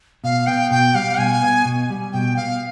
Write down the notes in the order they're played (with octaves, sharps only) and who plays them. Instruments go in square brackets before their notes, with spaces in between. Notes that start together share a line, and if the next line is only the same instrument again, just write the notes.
[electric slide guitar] B2 [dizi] F5
[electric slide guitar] B3 [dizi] G5
[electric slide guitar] B2 [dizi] G5
[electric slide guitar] G3 [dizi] F5
[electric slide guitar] B2 [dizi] G#5
[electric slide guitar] B3
B2
G3
[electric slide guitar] B2 [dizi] G5
[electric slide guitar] B3 [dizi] F5